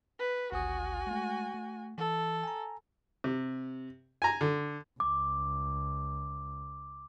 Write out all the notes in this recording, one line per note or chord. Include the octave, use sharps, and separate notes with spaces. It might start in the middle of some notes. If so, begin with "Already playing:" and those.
B4
G#1 D2 F#4 G#5 D#6
G#3 A3
A3
E3 A4
G#5 A#5
C3
G#5 A#5
D3
C#2 D6